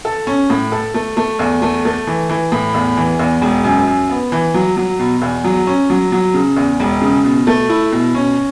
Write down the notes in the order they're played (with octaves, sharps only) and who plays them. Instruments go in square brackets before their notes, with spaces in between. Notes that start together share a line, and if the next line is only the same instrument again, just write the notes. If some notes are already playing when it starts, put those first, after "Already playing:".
[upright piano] A4
C#4
A2
A4
A3
A3
E2
A3
A3
E3
E3
A2
E2
E3
E2
E1
F#2
F#2
B3
E3
F#3
F#3
B2
E2
F#3
C#4
F#3
F#3
C#3
E2
E1
C#3
B2
A3
E4
B2
C#4